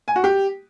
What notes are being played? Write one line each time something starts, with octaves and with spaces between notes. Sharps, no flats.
G#5
F#4
G4